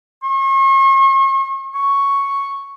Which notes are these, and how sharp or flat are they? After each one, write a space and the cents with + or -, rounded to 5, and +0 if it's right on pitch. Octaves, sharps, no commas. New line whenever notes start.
C#6 -40
C#6 +0